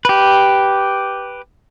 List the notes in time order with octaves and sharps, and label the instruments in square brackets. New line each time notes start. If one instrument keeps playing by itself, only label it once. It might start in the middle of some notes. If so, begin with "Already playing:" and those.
[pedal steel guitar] G4 B4